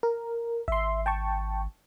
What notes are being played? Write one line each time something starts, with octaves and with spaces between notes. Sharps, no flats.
A#4
G#1 E5 C6
G5 A5 C#6